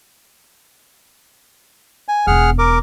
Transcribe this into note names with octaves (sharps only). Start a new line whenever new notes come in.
G#5
E1 B3 G#4 F#5 F6
A#4 D6